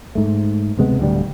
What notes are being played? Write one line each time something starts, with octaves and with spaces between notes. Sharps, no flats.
G#2 A3
D2 C3 G#3 B3
D1 D2 D3 G3